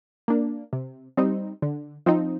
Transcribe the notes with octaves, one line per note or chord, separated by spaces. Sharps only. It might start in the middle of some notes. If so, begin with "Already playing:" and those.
A#3 D4
C3
G3 C4 D#4
D3
F3 C4 D#4